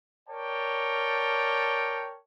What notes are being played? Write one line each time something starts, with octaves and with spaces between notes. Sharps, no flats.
A#4 C#5 D5 G5 A5